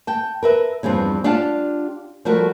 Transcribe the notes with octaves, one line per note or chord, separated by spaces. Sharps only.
G5 A5
A#4 B4 E5
E2 G2 F3 C4
D4 F4 G4 F5 F#5 A5
F3 G3 A3 F#4 A#4